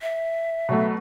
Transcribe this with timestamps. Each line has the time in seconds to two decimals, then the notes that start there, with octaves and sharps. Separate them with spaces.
0.01 E5
0.69 B2 F#3 A3